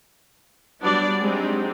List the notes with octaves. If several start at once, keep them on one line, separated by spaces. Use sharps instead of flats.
F#3 G3 B3 D4 D5
F#3 G#3 C4 D4 D#4 G4